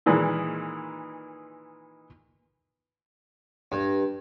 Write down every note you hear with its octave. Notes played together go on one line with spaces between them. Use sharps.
A#2 D#3 E3 G#3
G2